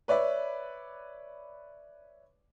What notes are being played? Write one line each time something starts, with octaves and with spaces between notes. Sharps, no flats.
B4 C#5 D5 E5